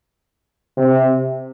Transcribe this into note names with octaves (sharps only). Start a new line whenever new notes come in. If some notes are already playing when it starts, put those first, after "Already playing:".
C3